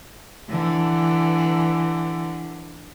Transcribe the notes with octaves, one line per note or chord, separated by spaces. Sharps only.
D3 E3